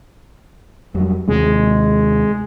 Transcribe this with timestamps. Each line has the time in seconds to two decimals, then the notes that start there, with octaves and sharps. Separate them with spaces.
0.94 F2 F#3 G3
1.28 D#2 C3 G#3 C4